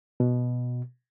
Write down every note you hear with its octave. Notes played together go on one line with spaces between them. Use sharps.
B2